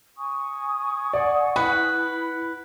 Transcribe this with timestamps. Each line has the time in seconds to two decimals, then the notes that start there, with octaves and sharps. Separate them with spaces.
0.17 G#5 C#6 D#6
1.13 D5 F#5
1.56 E4 B4 F#5